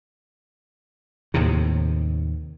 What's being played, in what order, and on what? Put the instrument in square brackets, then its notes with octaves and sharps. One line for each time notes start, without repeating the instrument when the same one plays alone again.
[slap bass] D#2 A2 C3